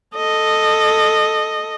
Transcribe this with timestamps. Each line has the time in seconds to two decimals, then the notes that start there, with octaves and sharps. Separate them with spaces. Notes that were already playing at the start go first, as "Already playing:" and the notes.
0.15 A4 D#5